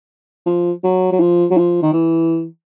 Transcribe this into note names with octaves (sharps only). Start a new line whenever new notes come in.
F3
F#3
F#3
F3
F#3
F3
D#3
E3